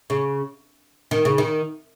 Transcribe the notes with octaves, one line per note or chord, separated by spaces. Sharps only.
C#3
D#3
C#3
D#3